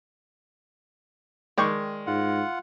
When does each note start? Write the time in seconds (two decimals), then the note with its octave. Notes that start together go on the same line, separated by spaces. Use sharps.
1.58 D#3 G#3 D5 G5 C#6
2.07 G#2 F4 F#5